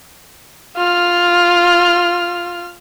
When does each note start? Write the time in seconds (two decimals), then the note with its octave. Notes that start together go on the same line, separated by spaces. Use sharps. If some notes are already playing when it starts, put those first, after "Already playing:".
0.77 F4 F6